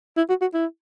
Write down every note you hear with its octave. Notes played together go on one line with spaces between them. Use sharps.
E4
F#4
F#4
E4